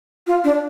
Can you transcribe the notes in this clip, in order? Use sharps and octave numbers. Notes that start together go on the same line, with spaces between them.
F4
D4